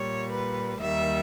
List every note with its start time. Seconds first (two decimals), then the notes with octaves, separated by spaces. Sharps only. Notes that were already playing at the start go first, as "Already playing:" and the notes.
Already playing: A#2 G3 C#5
0.32 B4
0.80 D#2 D#3 G3 E5